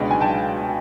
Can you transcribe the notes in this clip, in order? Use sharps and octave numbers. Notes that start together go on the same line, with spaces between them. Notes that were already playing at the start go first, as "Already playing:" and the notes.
Already playing: C#2 B2 G#3 B3 D4
G#5
G5 A5